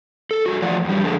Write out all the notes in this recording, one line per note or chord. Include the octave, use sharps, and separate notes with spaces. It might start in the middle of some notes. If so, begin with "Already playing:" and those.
A4
G2 D#3 F#4
E3 F3 A3 F4 D5 F#5
F2 G3
F2 A#2 D3 G#3 A3